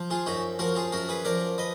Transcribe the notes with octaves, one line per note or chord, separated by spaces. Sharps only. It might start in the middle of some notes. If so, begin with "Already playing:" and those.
Already playing: F3
F4 G#4
F#2 D#4 F#4
F3 F#4 A#4
F4 G#4
F#2 F#4 A#4
G#4 B4
F3 A#4 D5
B4 D#5